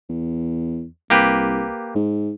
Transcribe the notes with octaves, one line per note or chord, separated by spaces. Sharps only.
E2
C2 A#3 G4 B4
G#2